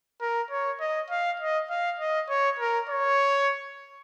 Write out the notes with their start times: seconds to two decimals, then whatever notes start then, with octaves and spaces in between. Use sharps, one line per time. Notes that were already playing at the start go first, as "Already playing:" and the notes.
0.21 A#4
0.51 C#5
0.80 D#5
1.10 F5
1.40 D#5
1.70 F5
2.00 D#5
2.29 C#5
2.59 A#4
2.89 C#5